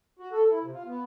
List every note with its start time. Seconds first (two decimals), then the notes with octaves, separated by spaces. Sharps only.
0.19 F#4
0.32 A4
0.50 E4
0.62 C3
0.74 F4
0.86 B3